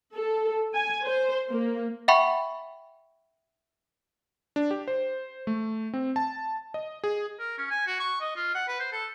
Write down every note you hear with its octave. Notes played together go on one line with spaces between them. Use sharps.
A4
G#5
C5
A#3
E5 F#5 G5 B5 C#6
D4
G4
C5
A3
C4
A5
D#5
G#4
A#4
C#4
G#5
F#4
C#6
D#5
F4
F#5
B4
C5
A4